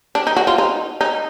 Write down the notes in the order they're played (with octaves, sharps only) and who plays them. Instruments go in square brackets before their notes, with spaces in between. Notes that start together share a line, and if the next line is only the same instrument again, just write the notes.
[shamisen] D4
D#4
F#4
F4
D#4
D#4